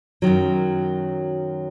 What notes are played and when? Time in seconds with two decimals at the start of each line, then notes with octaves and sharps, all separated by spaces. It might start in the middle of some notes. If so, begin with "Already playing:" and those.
0.22 F#2 D#3 F#3